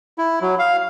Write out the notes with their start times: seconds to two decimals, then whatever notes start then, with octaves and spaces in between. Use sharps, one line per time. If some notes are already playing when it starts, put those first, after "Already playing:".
0.18 E4
0.41 F#3
0.59 F5